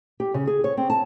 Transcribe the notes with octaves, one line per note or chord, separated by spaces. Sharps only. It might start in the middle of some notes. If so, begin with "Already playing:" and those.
G4
C#3
G#4
C#5
C4
A5